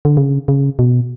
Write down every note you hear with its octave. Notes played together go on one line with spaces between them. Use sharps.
D3
C#3
C#3
B2